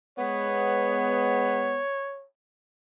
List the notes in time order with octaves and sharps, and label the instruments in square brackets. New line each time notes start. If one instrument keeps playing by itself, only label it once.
[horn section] G#3 B3 [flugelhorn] C#5